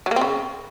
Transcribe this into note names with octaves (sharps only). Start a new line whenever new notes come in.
F#3
A#3
C4
C#3